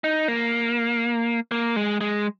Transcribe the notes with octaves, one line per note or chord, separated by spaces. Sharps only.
D#4
A#3
A#3
G#3
G#3